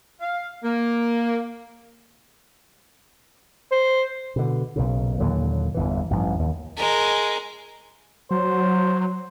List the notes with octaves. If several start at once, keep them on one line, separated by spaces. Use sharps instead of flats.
F5
A#3
C5
B2 D3
B1 A#2 C#3
D#2 A#2 D3 F#3
G1 E2 E3
A1 G2 F3
D#2
G#3 A#4
F#3 C5